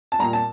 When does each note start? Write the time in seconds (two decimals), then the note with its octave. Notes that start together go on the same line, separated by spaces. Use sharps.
0.12 A5
0.19 A#2 G3 A#5
0.33 A5